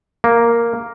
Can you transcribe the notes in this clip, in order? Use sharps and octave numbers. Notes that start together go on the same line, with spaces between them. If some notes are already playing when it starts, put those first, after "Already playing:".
A#3